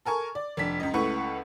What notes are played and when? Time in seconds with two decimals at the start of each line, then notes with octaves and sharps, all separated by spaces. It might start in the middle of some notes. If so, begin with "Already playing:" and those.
0.05 A4 A#4 G#5 C#6
0.35 D5
0.57 F1 D4 B6
0.80 C#2 F#2 D#5
0.93 C#2 A3 E4 B4 F#5 C#6